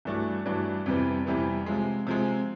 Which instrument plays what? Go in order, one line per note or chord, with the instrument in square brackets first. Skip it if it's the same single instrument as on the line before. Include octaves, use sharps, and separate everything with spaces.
[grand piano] G2 E3 A3 D4 F#4
G2 E3 A3 D4 F#4
F2 C3 E3 G3 B3
F2 C3 E3 G3 B3
C3 F3 G#3
C3 F3 G#3